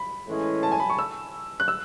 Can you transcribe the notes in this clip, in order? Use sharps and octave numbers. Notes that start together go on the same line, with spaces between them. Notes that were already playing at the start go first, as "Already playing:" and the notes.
Already playing: B5
A2 E3 G#3 C#4
A5
G#5
B5
C#6
E6
F#6
E6